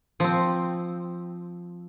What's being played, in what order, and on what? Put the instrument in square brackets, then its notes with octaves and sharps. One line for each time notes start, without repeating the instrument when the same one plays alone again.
[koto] F3 C4